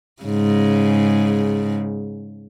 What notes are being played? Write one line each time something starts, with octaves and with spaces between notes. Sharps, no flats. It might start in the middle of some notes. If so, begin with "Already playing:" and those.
G#2 C#3